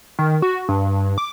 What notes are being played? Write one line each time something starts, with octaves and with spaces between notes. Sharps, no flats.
D#3
F#4
G2
D6